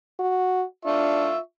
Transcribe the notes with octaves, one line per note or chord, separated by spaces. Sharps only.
F#4
D4 F4 E5 C#6